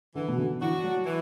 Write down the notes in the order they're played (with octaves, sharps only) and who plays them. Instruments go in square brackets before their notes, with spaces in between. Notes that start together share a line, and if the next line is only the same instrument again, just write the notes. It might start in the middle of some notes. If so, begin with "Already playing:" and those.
[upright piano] D3 [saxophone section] E3
[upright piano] B2
D3
[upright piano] E3 [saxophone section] D4 F#4
[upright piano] F#3
[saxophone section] E3